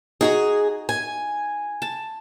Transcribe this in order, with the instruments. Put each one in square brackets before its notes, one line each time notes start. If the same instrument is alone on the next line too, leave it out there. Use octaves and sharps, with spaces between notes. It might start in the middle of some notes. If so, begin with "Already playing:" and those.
[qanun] D#4 F#4 A#5 [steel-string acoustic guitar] G#4
[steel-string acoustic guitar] G#5
[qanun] A5